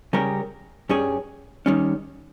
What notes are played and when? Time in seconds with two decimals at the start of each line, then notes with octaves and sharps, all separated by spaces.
0.13 C#3 G3 C#4 G4 A#4
0.89 G2 G3 C#4 G#4 C#5
1.66 D#3 G3 C#4